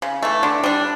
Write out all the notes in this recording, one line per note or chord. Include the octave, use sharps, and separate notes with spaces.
C#3
E3 A3
D3
G3 D4